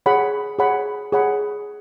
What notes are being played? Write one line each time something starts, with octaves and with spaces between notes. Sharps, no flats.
G#4 C#5 F#5 B5
G#4 C#5 F#5 B5
G#4 C#5 F#5 B5